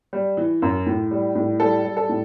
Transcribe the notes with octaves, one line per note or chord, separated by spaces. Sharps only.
G3
E3
F#2
A2
G3
A2
G3 A4
G3
A4
A2